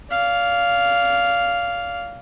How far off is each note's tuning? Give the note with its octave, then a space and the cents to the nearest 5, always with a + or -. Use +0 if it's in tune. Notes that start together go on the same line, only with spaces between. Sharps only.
D5 -40 F5 +0